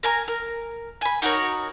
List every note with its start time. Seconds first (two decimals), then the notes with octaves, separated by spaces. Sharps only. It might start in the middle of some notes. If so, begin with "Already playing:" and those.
0.03 A#4 G#5 A#5
0.28 A#4
1.01 G#5 B5
1.22 D#4 F#4 A#4 C#5